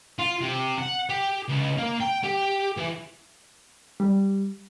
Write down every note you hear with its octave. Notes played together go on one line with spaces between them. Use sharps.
F4
C3
F#5
G4
C#2
A#3
G5
G4
E3
G3